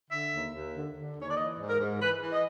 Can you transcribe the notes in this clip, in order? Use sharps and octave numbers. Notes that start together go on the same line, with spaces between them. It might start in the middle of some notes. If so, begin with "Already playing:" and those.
D3 E5
D#2
D#2
D3
D3
D#2 C#5
D5
E3 D#5
G#2
A#4
G#2
E3 B4
E3
D#5